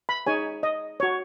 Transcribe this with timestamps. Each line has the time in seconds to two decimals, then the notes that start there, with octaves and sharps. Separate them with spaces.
0.09 B5
0.27 D#4 G#4 C#5 G#5
0.63 D#5
1.00 C#5
1.03 F#4